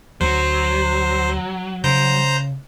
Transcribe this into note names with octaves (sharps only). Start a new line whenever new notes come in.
D2 F#3 C5
C#3 C5 A#5 G6